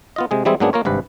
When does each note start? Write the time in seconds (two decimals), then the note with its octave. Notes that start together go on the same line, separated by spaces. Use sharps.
0.16 B3 F4 D#5
0.31 C3 G#3 G#4
0.45 E3 G3 G#3 C4 E4 G#4
0.60 G#2 F#3 A#3 B3 D4 G#4
0.73 A#3 F4 A#4 C#5
0.85 G#1 G2 C3 B4